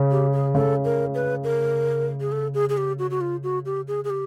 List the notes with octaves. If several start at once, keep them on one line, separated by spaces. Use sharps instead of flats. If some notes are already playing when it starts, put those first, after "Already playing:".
Already playing: C#3
G4
G#4
C#3 A4
A#4
B4
A#4
G#4
A4
G#4
G#4
G4
F#4
F#4
F4
F#4
G4
G#4
G#4
G4